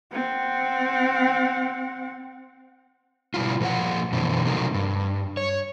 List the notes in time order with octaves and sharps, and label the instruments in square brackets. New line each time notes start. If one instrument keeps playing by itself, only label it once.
[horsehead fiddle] C4 F#5
[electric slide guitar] B2 G3 E4 F4
A#2 F3 A#4 F#5
F#2 B2 D3 E3 C4
C3 F3 F#3 A3 D#4 A#4
G2
C#5